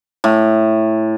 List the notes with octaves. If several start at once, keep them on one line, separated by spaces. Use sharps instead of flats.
A2